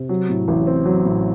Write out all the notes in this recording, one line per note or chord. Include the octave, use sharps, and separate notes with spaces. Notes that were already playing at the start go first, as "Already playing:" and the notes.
Already playing: C3
F#3
A2
A1
C4
F#3
A2